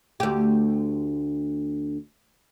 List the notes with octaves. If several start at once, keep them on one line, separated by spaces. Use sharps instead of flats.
D2 G4